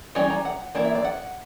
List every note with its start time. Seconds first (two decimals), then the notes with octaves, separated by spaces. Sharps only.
0.15 E3 G3 C#4 D5
0.30 A#5
0.45 F#5
0.75 E3 A#3 E4 D5
0.85 E5
0.95 D5
1.04 F#5